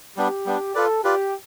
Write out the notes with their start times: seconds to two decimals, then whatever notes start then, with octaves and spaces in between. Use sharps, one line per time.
0.17 G3 B3 D4 G4
0.46 G3 B3 D4
0.75 F4 A4 B4 D5
1.04 F4 G4 B4 D5